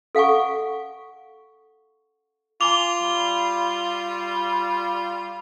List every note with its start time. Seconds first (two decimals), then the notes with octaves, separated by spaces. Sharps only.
0.15 A4 F5 F#5 G#5 C#6
2.61 F4 G#5 A#5 D6 F7 G7
3.03 G3